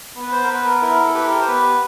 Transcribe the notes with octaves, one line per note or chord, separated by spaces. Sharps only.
B3
B4
C5
A#4
B3 B4
A#4
E4 A#4
A4
G4 B4
A#4
C5
B3 B4